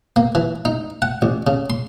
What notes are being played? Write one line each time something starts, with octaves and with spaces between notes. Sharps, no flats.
A#3
E3
D#4
F#5
A1
C#3
C6